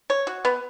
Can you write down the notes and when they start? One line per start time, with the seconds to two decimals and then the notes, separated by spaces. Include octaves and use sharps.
0.10 C#5
0.27 F#4
0.45 B3